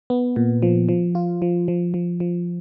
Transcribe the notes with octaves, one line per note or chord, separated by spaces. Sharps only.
B3
A#2
F3
F3
F4
F3
F3
F3
F3